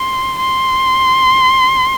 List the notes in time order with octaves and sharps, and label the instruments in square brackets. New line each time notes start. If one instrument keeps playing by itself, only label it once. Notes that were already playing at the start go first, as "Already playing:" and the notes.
Already playing: [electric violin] C6
C6